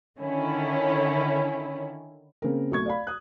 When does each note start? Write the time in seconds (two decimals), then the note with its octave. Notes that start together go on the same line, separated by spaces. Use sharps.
0.19 D3 D#3 C#4 E4
2.42 C#3 A#3 C4 A#4
2.71 B1 A3 C#6 G#6
2.86 D5 F5 B5
3.07 D#6 F#6